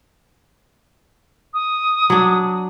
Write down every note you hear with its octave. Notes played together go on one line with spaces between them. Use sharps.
D#6
F#3 D4